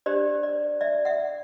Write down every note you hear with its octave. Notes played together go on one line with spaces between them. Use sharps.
D4 G4 C5 D5
D5
D5 E5
E5 F#5